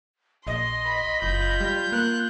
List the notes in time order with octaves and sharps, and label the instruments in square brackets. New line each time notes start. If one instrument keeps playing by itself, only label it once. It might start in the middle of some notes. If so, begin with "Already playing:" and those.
[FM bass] A#1 [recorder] D#5 [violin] C6
[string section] B5
[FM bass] F#1 [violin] F4 G6
[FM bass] G3
[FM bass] A#3 [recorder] F#6